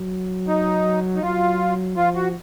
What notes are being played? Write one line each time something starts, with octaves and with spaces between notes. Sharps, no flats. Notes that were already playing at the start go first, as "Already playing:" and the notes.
Already playing: F#3
D#4
D#4
F#3 F4
F3 F4
F#4